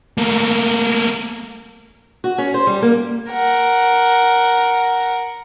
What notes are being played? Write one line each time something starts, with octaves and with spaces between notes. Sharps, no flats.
A3 A#3
F#4
C#4
C5
G3
A#3
A#4 F#5